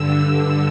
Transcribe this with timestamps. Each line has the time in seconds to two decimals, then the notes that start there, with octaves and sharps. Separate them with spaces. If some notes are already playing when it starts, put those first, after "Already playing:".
Already playing: G2 D3 E6
0.21 E6